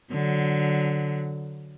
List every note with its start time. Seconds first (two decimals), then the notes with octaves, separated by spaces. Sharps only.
0.12 D3 F#3